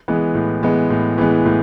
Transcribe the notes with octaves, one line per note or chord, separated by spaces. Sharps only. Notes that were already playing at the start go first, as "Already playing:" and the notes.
E3 G#3 B3
A2
E3 G#3 B3
A2
E3 G#3 B3
A2